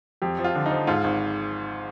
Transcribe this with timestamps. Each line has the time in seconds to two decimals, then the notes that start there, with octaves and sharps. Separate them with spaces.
0.22 F2 G4
0.39 F3
0.44 F4
0.55 D3
0.66 F3 D#4
0.87 G#2 F4
1.04 G#1